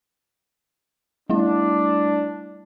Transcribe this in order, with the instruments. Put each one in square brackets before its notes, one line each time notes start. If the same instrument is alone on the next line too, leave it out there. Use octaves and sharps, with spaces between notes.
[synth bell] G3 A3 E4 [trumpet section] D4